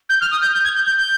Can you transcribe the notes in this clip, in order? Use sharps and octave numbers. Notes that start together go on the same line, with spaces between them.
G6
F6
D#6
G6
G6
G#6
G6
G6
G6